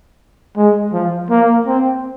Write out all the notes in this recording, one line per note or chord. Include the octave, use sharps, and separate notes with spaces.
G#3
F3
A#3
C4